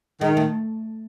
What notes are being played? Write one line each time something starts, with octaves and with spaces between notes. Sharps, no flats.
D#3 G#3
A3